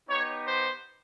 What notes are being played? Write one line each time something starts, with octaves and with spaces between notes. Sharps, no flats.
B3 D#4 G4 C#5
C5